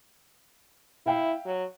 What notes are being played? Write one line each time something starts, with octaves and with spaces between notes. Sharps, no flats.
E4 E5 F5 G5
F#3